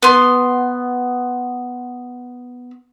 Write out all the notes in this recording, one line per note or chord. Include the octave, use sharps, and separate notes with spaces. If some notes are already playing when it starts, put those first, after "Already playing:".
B3 C6